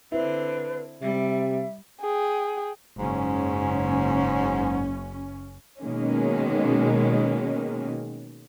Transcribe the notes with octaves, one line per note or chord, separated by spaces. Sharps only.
D3 C4 E4 B4
C3 G3 E5
G#4 G5
F#1 G#2 C#4
B2 D#3 G#3 A#3 C#4